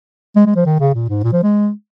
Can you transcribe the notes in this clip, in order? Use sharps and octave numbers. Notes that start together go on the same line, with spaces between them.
G#3
G#3
F3
D#3
C#3
A#2
G#2
A#2
F3
G#3